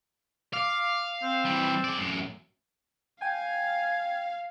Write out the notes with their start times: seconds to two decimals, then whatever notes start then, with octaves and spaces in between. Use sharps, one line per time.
0.53 F5 D6
1.23 C4
1.45 E3 G3
1.84 G#4 D5
1.98 F#2 A2
3.22 F5 G5 G#5 G#6